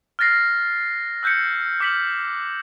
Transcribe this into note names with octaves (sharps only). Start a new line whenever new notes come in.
F6 F#6 A6 A#6 C7
E6 F#6 G6 B6 C#7
D6 F6 B6 C#7 F#7